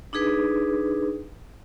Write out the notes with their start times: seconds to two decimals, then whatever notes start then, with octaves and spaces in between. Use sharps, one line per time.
0.13 D4 D#4 G#4 B4